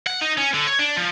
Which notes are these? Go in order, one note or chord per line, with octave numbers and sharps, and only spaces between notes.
F#5
D#4
C#4
D3
C#5
D4
F3